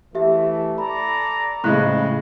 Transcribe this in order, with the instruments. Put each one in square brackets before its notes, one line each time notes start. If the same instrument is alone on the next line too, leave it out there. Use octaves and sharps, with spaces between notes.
[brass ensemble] E3 A3 [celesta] G4 E5
[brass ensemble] A4 D5 A#5 [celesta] B5
[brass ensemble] F2 [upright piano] A2 C#3 G#3 [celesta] B5 F#6 A#6